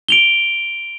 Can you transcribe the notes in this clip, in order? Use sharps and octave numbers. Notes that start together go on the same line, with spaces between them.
D7 F7 G7